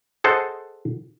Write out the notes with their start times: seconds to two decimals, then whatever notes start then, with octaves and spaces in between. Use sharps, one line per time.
0.24 G#4 A4 C5 D#5 F#5